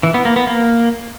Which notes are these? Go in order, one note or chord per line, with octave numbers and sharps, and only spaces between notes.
E3
B3
A#3
B3
A#3